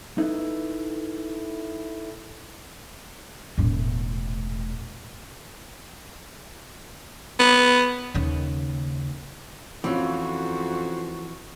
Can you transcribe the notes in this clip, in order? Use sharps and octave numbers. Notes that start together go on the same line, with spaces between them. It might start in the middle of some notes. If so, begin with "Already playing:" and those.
D#4 E4 A4 B4
E1 A2
B3
D#2 C#3
F2 E3 C4 C#4 F4 F#4